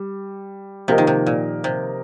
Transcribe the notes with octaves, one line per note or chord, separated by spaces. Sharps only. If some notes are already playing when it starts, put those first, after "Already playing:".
Already playing: G3
C3 F3 A#3 G4 A#4 D#5
D#3
C3
A#2
C3